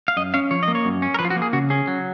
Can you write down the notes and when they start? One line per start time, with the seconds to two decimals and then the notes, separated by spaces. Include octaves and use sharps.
0.08 F5
0.17 F#2 D#5
0.34 C#4 F5
0.51 F3 C#5
0.63 D#5
0.68 A#3
0.75 C#5
0.85 F#2
1.02 C#4
1.14 A#4
1.19 F3 B4
1.25 F4
1.30 F#4
1.36 A#3
1.42 G#4
1.53 C#3 F#4
1.70 C#4 G#4
1.87 F#3